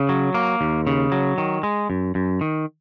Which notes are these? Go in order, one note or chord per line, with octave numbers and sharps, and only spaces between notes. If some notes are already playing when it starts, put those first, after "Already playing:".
Already playing: C#3
F#3
A#3
D#2
C#3
F#3
D#3
G#3
F#2
F#2
D#3